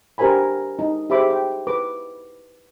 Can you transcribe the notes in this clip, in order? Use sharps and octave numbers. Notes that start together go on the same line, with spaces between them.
D4 G4 A#4 C5 G#5 B5
D#4
G4 G#4 C5 E5 B5 D6
G5
B4 D6